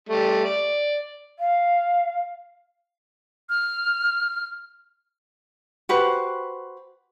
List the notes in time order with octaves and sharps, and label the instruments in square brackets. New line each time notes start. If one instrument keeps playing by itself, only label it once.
[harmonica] G3 A3
D5
[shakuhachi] F5
[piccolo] F6
[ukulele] F#4 G4 B4 C5